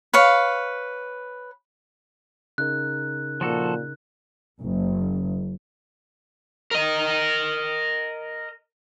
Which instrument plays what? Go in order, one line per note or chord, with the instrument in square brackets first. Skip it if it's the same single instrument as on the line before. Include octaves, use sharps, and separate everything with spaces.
[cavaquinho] B4 C#5 F5
[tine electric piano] C#3 D#4 A#4 [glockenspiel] F#6
[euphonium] A#2 [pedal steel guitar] F3 F#4 A4
[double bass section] F#1
[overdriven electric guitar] A#4 D#5